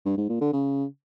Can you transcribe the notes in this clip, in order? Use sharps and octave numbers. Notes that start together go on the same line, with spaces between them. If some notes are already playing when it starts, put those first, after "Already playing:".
G2
G#2
A#2
D3
C#3